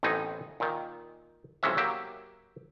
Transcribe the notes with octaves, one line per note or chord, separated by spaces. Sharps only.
A1 A2 B3 C4 D#4 G#5
A#2 D#3
B1 C3 E3 G#3 C#4 E5
F#3 A#3 G4 E5